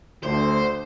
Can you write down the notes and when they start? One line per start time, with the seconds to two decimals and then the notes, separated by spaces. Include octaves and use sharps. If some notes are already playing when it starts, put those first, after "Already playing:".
0.23 D2 C5